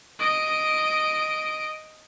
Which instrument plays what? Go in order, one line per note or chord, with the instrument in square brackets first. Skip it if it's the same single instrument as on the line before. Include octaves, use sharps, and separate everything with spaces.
[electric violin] D#5 D7